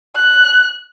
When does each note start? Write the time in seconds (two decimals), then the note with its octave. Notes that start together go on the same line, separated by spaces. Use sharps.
0.16 F#6